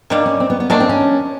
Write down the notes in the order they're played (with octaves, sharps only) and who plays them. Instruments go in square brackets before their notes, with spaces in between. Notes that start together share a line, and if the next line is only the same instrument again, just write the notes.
[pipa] D#3 G3 A#3 [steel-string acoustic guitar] D4
[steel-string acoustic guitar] C#4
C4
B3
B3
[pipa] D#3 F#3 A3 D4 [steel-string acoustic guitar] A#3
[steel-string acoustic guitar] C4
C#4